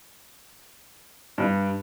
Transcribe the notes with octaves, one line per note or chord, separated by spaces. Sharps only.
G2